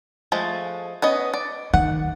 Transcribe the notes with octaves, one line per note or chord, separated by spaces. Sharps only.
F3 G#3 A3
B3 C#4 D#5
D5
D#3 F#5